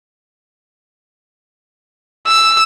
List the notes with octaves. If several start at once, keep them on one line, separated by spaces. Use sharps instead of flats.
E6